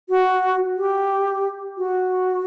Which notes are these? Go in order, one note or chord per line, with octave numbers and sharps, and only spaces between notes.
F#4
G4
F#4